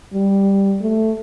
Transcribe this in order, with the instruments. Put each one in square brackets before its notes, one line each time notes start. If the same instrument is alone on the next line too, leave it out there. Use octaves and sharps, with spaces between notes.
[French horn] G3
A3